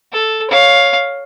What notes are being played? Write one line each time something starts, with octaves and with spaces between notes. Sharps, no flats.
A4
C#5 F5